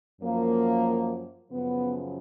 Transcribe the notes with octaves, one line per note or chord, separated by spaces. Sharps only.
F#2 F3 A#3
F#2 C#3 F3 B3